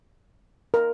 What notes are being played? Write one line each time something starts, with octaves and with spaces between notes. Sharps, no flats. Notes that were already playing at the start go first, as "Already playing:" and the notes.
A#4